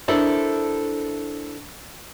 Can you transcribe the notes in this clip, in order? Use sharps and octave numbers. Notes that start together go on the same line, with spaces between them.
D4 E4 A4 A#4 C5 D5